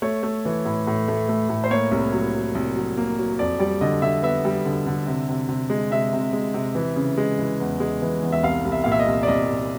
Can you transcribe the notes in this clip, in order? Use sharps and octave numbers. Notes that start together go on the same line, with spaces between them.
A3 C#5
A3
E3
A2
A2
A3
A3
A2
C5
A#3 C#5
C2
F#3
F#3
C2
F#3
A#3
F#3
F2 D5
G3 D5
D3 D#5
D3 E5
B3 E5
G3
D3
D3
C3
C3
C3
G#3
C3 E5
C3
G#3
C3
E3
C#3
G#3
E3
E2
G#3
E3
E2
E5
C2 F5
C2
E5
A#2 F5
E5
D#5
C2
D5
C2 D#5
A#2